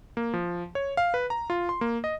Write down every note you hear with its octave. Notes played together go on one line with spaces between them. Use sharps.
A#3
F3
C#5
F5
B4
A#5
F4
C6
A#3
D#5